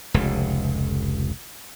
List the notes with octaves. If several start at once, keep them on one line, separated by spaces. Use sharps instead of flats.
F1 C#2